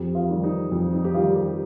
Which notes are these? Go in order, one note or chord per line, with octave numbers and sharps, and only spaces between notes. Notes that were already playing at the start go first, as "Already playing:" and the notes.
Already playing: F2 G4
F4
D#3 G3
D#4
F2
D#4
G4
D#3 G3 F4
G4